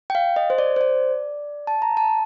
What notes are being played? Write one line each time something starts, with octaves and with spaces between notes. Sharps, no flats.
G5
F5
D#5
C5
D5
C5
D5
A5
A#5
A5